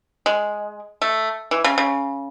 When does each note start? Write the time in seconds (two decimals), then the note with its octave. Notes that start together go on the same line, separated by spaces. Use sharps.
0.26 G#3
1.02 A3
1.51 E3
1.64 C#3
1.78 C#3